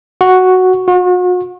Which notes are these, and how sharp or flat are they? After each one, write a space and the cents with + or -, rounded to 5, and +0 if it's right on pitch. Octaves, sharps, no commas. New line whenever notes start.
F#4 +0
F#4 -40